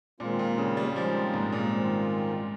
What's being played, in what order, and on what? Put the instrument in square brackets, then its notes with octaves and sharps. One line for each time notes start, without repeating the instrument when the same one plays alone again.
[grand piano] A#2 [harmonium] D#3 G#3 C4 F4
[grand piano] A#2
C#3
G3
[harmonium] D#3 G#3 C4 F4 [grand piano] F3
[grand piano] G#2
A#2
[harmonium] D#3 G#3 C4 F4